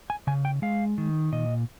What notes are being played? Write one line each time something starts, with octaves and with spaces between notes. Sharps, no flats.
G#5
C#3 G#5
G5
G#3 F5
D#3
A#2 D#5